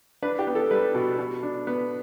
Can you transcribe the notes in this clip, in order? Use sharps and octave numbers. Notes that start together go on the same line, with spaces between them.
D4 B4
G4
B3
A4
G3 B4
B2
B2
D4
B3